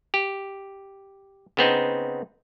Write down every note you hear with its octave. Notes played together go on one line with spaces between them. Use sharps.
G4
C#3 B3 C4 D#4